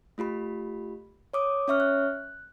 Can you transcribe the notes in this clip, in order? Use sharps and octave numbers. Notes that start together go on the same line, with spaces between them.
A3 F4 G4 B5
C#5 D6 D#6
C#4 C#5 E5 C#6 F6
F#6